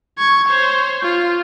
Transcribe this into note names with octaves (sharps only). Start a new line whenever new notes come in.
C#6 G#6
C5 C#5
F4